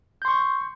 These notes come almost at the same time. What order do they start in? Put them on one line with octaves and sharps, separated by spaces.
G6 C6 C#6